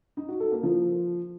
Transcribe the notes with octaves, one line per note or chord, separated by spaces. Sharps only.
D#4
F#4
A4
A#3
F3